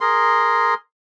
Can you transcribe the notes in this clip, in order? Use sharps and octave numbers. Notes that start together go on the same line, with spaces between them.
G#4 A#4 C6